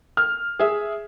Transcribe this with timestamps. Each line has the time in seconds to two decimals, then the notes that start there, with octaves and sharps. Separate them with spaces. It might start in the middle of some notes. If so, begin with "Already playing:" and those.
0.17 F6
0.59 G#4 E5